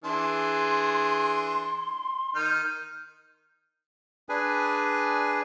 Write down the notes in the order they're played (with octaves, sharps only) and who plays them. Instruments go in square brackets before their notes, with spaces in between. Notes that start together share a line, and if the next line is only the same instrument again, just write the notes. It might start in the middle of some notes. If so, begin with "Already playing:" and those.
[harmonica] E3 D4 G#4 [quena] C6
[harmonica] D#3 D#4 F6 [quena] G6
[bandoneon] D4 G#4 B4 G#5